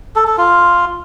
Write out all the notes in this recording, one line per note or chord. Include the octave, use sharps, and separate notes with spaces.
A4
A4
F4